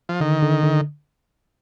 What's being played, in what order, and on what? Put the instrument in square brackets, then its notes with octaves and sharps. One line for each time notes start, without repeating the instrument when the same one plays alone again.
[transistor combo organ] F3
[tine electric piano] D3 [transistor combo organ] D#3
[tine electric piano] D3
D3